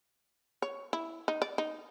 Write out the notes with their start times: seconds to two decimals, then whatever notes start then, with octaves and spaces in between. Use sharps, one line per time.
0.62 C#5
0.93 E4
1.28 D#4
1.42 D5
1.58 D#4